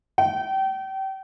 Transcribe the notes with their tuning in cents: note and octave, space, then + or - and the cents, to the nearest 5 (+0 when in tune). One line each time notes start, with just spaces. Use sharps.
G5 -30